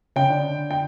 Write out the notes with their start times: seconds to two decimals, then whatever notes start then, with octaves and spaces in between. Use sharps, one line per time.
0.16 C#3 G5
0.30 D3
0.71 G5